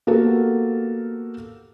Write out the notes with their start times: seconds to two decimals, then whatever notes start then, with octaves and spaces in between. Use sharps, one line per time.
0.07 A#3 B3 F#4 G4 A4 A#4